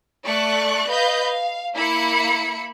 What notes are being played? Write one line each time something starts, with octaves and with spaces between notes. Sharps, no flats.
A3 D5 C#6 F#6
B4 D#5 F5 G6
F5
A#3 E4 E5 B5 C#7